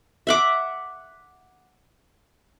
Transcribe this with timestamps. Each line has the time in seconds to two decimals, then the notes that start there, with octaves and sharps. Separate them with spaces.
0.27 E5 F#5 D6